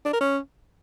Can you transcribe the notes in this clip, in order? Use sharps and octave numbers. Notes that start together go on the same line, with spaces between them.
D4
A#4
C#4